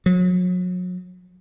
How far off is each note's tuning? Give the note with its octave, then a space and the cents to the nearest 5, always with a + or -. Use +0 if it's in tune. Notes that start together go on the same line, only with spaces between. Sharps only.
F#3 -35